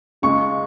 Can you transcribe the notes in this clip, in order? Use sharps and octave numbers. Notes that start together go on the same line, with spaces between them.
C#2 C#3 G#3 C#6